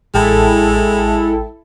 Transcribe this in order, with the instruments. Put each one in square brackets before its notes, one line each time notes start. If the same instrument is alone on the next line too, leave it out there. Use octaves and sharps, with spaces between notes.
[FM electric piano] A1 G5 A5 [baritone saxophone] G#3 [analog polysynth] E4 A4